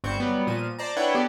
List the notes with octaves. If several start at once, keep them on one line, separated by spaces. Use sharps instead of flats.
G1 G2 C4 C#6 G6
F#3 G3 B3
A#2 F3 D#7
C5 D5 A5 A#5
D4 E4 B4 C#5 F#5 G5
B3 G4 A4 D5